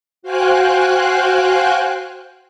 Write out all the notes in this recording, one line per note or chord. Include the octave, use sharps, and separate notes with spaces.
F#4 C5 F5 G5 G#5 F#6